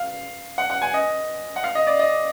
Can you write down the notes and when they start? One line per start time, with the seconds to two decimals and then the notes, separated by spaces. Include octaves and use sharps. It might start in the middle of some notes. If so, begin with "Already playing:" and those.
Already playing: F5
0.58 F#5
0.70 F#5
0.82 G#5
0.94 D#5
1.56 F#5
1.64 F5
1.75 D#5
1.87 D5
1.99 D#5